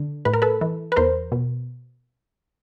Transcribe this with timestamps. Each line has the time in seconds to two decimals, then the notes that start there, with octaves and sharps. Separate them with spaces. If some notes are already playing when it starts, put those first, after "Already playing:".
Already playing: D3
0.25 A2 B4
0.34 A#4
0.42 A4 B4
0.61 E3
0.92 B4
0.96 E2 A#4 C5
1.32 B2